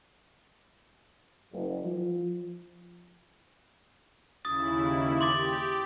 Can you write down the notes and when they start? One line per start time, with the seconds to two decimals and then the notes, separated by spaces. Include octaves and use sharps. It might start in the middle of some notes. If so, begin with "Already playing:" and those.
1.52 F#1
1.85 F3
4.45 D#2 C#3 E4 D#6 A6
5.21 G4 C6 D6 A6